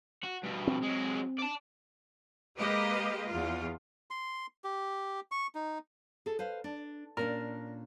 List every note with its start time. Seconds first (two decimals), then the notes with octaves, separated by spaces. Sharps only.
0.24 F#4
0.44 G2 B2
0.67 C4
0.83 F#3 G#3
1.39 D5 A5
2.58 G#3 A#3 G4 B4 D#5
3.28 E2 F4
4.10 C6
4.64 G4
5.31 C#6
5.55 D#4
6.26 G#4 A4
6.39 B4 C5 F5
6.64 D4
7.17 A#2 C#4 D4 A#4